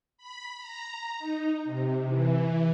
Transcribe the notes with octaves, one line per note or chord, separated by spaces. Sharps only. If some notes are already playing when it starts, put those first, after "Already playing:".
B5
A#5
D#4
C3
E3